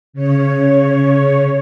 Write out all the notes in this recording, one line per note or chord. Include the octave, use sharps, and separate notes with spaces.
C#3 C#5